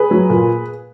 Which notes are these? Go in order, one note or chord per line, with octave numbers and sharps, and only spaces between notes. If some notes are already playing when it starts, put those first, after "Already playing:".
Already playing: G#4 B4
F#3
A#2